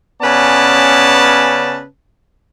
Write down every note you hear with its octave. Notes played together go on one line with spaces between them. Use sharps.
C#3 B3 C#4 B4 D5 A5